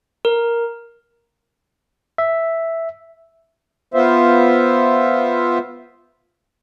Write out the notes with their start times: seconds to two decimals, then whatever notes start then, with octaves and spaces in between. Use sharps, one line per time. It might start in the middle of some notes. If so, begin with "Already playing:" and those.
0.25 A#4
2.18 E5
3.94 B3 F4 C5 E5